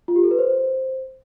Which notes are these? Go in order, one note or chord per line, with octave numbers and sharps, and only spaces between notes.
F4
G4
A4
B4
C5